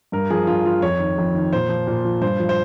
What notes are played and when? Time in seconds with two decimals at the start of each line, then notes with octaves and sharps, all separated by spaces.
0.12 G2 A#4
0.30 F3 G#4
0.47 G2 F4
0.65 F3 F4
0.82 F2 C#5
0.99 D#3
1.18 F2
1.34 D#3
1.52 A#2 C5
1.69 F3
1.87 A#2
2.05 F3
2.21 G2 C5
2.40 F3
2.49 C5